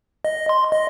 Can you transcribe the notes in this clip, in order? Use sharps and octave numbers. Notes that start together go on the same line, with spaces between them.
D#5
C6
D#5